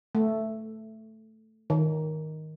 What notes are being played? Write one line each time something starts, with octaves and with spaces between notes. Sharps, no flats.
A3
D#3